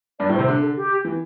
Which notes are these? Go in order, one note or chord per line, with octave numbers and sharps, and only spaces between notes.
G2 D5
A2
C5
C3
D3
A4
G4
E3